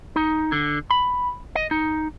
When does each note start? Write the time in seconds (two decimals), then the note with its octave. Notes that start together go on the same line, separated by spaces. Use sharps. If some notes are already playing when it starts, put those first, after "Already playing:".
0.16 D#4
0.52 D3
0.90 B5
1.55 D#5
1.71 D#4